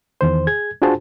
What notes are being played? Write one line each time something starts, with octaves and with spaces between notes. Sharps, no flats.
E2 D#3 C5
G#4 G#6
D4 F4 F#4 G#4 C5 A5